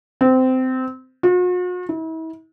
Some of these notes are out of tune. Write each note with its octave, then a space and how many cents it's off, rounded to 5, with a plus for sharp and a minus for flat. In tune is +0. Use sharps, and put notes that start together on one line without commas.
C4 -20
F#4 -45
E4 -40